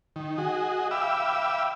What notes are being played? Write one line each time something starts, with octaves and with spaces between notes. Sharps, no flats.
D#3
F#4 G#4 D#5
E5 F5 G5 B5 D6 E6